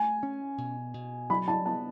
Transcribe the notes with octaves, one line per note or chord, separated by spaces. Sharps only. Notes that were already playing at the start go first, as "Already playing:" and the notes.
Already playing: A3 G#5
C#4
B2
B2
F#3 B5
A5
B3 A5